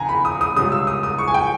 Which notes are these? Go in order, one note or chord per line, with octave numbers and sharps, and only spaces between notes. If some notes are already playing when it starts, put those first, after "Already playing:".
Already playing: D#2 C#3 G#5 A#5
B5
D#6
D#6
C#2 C#3 G3 C#4 D#6
E6
D#6
D#6
C#6
G#5
G5